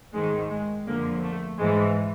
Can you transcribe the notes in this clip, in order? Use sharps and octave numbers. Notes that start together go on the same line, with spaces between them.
G#2 D#3 G#3
G#3
F2 D3 F3 A#3
A3
G#2 E3 G#3